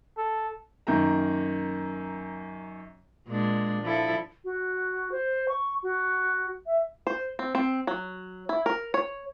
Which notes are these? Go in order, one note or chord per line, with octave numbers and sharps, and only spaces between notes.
A4
F#2 D#3 A#3 A#5
A#2 G#3 D4
F3 E4 A4
F#4
C5
C#6
F#4
E5
C5
C4
C4
F#3
E4
A#4
C#5